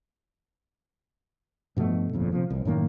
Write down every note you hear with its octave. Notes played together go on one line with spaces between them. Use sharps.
G2 B2 F3 A3
G1 F2 A#2
C3 F3
C2
F#2 A2 D#3 A#3